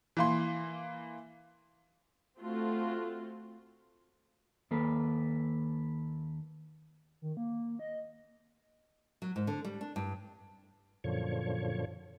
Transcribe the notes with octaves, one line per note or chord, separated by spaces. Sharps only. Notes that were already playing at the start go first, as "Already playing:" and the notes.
E3 A#3 C6
A3 C4 F4 F#4
D#2 A#3 A4 B4
D#3
A#3
D#5
F#3
G#2
D3
G3
D4
G2
F#2 A#2 D3 F3 C#5